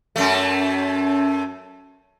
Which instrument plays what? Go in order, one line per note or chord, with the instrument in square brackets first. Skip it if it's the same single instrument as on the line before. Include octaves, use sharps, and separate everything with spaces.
[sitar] F#2 A3